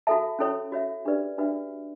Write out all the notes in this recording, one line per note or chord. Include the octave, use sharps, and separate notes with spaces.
F#4 A4 E5 A5
C#4 E4 A4 C#5
F#4 C#5 E5
D4 G4 B4 D5
D4 F#4 B4 E5